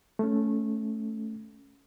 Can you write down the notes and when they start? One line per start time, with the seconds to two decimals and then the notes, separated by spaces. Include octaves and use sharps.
0.19 A3 C#4